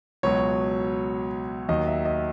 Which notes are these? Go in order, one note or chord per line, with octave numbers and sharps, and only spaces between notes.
C#2 B2 F#3 C#5
D#2 D#3 F#3 D#5
E5
D#5